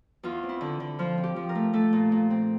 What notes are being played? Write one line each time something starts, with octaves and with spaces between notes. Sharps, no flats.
E2 F4
C4
E4
D3
D3
F3 F4
C4
G4
F3
A#4
A3
A3 A4
A#2
A#2
C4